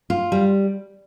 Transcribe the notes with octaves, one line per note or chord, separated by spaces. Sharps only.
F4
G3